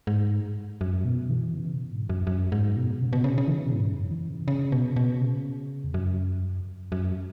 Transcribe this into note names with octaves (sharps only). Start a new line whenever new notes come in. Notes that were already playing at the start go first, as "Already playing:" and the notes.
G#2
F#2
B2
E3
C#3
B2
G#2
F#2
F#2
G#2
B2
C#3
B2
C#3
C#3
E3
C#3
B2
G#2
F#2
E3
C#3
C#3
B2
B2
C#3
E2
F#2
F#2